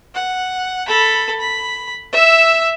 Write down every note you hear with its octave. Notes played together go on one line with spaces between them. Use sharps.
F#5
A4 B5
B5
E5 E6